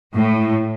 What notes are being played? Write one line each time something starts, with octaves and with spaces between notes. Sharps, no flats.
A2